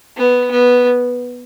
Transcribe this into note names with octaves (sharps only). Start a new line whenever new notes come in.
B3
B3